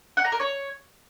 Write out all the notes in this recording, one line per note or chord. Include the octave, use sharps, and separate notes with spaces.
F#5
A#5
A#4
C#5